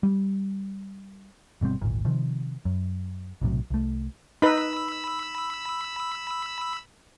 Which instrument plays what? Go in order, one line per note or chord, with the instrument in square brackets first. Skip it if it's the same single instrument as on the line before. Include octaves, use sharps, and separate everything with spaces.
[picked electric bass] G3
G1 B2 G3 C4
D1 G#1 A#2 A#3
C3 D#3 F3
F#2
B1 A2 C3 F#3
C2 A3
[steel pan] D#4 B4 [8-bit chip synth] B5 E6